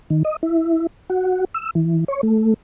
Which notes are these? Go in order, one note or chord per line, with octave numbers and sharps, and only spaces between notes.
D#3
D#5
E4
F#4
E6
E3
C#5
A3